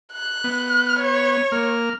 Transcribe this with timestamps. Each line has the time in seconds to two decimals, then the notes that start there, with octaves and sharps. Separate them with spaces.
0.12 F#6
0.44 B3
0.99 C#5
1.52 A#3 F6